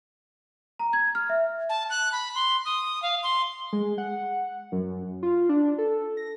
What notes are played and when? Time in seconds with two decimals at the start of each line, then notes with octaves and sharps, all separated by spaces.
0.79 A#5
0.93 G#6
1.15 F6
1.30 E5
1.69 A5
1.90 F#6
2.12 B5
2.35 C6
2.65 D#6
3.02 F5
3.23 C6
3.73 G#3
3.98 F#5
4.72 F#2
5.23 F4
5.49 D4
5.78 A4
6.17 A#6